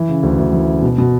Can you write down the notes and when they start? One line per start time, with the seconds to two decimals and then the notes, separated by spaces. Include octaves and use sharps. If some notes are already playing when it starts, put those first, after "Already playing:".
Already playing: E3
0.09 C#3
0.23 D2
0.38 D2
0.53 E3
0.68 C#3
0.82 B2
0.98 B2